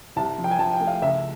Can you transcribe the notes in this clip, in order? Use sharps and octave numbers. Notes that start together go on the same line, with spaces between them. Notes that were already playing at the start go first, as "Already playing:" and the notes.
C2 A5
F3
G5
G#5
F3 A5
G5
A3
F5
C#2 E5